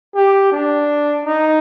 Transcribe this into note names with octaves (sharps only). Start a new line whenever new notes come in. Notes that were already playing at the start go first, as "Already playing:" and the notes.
G4
D4
D#4